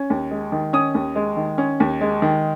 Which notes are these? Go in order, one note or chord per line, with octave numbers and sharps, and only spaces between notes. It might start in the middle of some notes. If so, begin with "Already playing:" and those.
Already playing: C#4
D#2
G#3
D#3
C#4 D#6
D#2
G#3
D#3
C#4
D#2
G#3
D#3